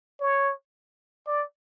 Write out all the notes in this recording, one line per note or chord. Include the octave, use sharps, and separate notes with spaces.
C#5
D5